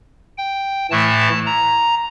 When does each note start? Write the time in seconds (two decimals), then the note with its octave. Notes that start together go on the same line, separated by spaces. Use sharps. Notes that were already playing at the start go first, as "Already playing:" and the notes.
0.38 G5
0.91 A2 E3 A3 A5
1.46 A#5